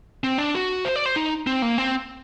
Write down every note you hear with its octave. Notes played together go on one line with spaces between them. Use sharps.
C4
D4
F#4
C5
D5
C5
D#4
C4
A#3
C4